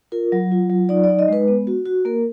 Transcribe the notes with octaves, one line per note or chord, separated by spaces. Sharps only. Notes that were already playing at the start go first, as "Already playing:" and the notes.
F4 A#4
F#3
F4
F#3
D#4 D5
D5
D#4
D#5
G#3 B4
B3
F#4
F#4
A#3 A#4